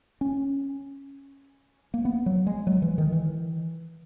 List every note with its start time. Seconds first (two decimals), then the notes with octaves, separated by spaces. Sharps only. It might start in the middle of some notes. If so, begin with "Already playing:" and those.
0.21 C#4
1.94 A#3
2.05 B3
2.26 F#3
2.47 G#3
2.67 F#3
2.82 E3
2.98 D#3
3.12 E3